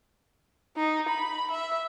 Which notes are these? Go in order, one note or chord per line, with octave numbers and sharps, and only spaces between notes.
D#4
B5
E5